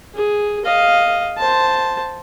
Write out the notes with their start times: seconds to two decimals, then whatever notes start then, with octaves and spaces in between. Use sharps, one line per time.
0.14 G#4
0.65 D#5 F5
1.38 C5 A5